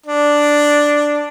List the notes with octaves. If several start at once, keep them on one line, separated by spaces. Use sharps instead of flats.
D4